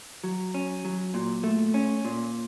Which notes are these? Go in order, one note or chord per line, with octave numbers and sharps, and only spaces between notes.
F#3
C#4
F#3
A#2
A3
C#4
A#2